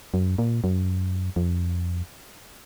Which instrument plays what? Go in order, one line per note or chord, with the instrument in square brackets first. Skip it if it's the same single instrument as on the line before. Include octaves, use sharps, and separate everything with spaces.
[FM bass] F#2
A#2
F#2
F2